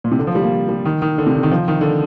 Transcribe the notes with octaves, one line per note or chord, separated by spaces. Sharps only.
A#2
C3
D3
F3
G3
A#3
G3
D#3
D#3
D3
C3
D3
D#3
F3
D#3
D3